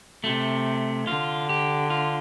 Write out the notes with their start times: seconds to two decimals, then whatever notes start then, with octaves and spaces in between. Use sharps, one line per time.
0.24 C3 A3
1.07 D3 F4
1.49 G4
1.90 F4